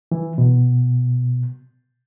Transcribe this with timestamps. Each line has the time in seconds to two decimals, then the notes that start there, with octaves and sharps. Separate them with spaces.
0.12 E3
0.38 B2